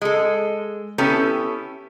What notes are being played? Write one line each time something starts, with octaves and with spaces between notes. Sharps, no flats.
G#3 A4
B3 C#4 E4 G4 A4